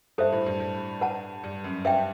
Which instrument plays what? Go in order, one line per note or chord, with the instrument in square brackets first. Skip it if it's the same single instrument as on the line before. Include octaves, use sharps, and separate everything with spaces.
[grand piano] G2 [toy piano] A4 C5 E5
[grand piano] A2
G2
G2
[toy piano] B4 F#5 A5
[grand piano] G2
F#2
[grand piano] G2 [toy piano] B4 E5 G5